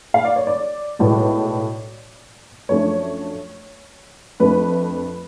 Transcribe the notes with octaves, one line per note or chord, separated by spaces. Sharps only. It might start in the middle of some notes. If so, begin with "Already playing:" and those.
F5
D5
C#5
D5
B1 A2 G#3 B3
F#2 F3 A3 D4 C#5
F2 F3 A3 D4 B4